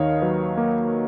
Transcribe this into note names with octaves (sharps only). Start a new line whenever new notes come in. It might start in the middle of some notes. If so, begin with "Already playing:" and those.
Already playing: D#2 D#3 C#5 D#5 F5
F#3 B4
A#3